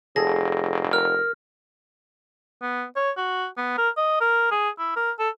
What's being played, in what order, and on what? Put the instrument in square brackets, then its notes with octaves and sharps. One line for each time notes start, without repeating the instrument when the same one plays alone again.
[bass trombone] F1 [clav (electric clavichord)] G#4 A4 [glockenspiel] A#6
[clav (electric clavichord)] A#4 [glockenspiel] F6
[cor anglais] B3
C#5
F#4
B3
A#4
D#5
A#4
G#4
E4
A#4
A4